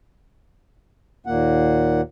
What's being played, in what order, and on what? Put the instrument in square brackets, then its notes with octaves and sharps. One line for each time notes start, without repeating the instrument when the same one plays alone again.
[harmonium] D#2 A#2 A#3 F#5